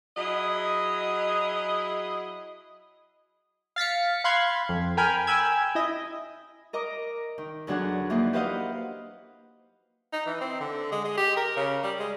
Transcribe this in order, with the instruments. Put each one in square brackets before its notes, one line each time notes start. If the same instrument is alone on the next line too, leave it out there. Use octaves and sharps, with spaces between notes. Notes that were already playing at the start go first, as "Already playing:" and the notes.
[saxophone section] F#3 E4 G#4 D#5
[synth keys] F5 A6 B6 C#7
F5 B5 C6 F#6 G#6
F2
A#4 G5 G#5 B5 F6
G5 G#5 B5 E6 G#6
E4 D#5
[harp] A#4 D#5 A#5 D6
D#3
E2 D3 F#3 D4 G#4 F#5
E3 F3 A#3 D#4
G4 B4 C5 D#5 F5 F#5
[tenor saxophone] D#4
E3
C4
D3
G#3
G#3
G4
A#4
C#3
G3
G#3